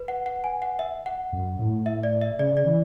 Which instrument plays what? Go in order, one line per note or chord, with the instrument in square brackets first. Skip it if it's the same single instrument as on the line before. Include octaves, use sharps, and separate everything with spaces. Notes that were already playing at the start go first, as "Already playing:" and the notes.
Already playing: [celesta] B4
F#5
F#5
G#5
F#5
E5
F#5
[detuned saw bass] F#2
A2
[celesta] E5
D5
E5
[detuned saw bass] C#3 [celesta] D5
[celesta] D5
[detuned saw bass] E3